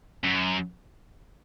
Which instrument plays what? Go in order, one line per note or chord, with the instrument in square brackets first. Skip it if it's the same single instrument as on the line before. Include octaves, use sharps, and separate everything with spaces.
[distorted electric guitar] F#2